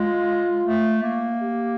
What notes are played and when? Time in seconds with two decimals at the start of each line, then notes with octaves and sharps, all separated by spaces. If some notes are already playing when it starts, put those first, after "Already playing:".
Already playing: G#3 F4
0.64 A3
1.03 A#3
1.42 G4